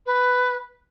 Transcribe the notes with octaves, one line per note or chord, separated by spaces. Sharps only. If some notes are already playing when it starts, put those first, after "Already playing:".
B4